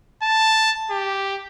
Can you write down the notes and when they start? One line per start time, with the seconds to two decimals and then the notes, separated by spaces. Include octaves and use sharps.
0.22 A5
0.91 G4